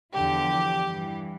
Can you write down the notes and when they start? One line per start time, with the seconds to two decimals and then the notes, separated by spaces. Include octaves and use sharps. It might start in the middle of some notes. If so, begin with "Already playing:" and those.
0.13 E2 D3 F3 G4
0.88 G2 E3